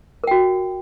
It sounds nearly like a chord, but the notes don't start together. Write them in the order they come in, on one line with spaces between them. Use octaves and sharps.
A#4 G5 F#4